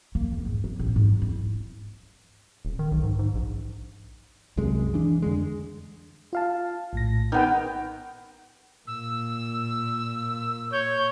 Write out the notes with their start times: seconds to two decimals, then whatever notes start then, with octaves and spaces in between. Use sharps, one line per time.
0.15 A#3
0.33 E2
0.45 G#2
0.64 E3
0.79 A1
0.96 G#2
1.09 F#3
1.22 E4
2.65 D#1
2.79 D#3
2.92 B1
3.03 G#2
3.19 G#2
3.35 A#1
4.57 C2 F#2 C3 G#3
4.94 E3 D4
5.22 F2 D3 G#3
6.33 F4 F5 A5
6.93 A#1 A2 A#6
7.32 D#3 B3 G5 G6
8.87 A#2 E6
10.72 C#5 G6